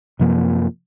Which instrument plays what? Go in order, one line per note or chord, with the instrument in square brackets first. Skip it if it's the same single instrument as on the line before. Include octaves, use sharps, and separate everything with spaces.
[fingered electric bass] F#2 C3 F3 A#3